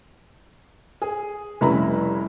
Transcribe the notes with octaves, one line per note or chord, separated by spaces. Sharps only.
G#4
F1 G3 C#4 E4 A#5 B5